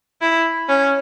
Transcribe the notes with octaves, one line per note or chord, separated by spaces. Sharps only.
E4
C#4